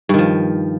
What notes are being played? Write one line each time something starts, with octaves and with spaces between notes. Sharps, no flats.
G2 D#3 F3